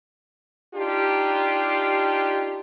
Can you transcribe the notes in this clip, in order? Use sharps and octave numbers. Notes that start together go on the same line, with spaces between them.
D4 D#4 F4 G4